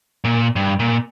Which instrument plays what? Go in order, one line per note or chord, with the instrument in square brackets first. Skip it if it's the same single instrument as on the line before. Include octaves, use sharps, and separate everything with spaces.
[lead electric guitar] A#2
G2
A#2